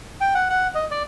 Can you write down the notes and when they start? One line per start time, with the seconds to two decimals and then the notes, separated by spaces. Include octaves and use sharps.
0.21 G5
0.35 F#5
0.50 F#5
0.75 D#5
0.91 D5